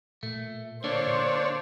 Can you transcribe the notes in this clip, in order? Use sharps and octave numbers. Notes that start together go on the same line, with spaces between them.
A#2 A3
D3 A#3 D4 C5 C#5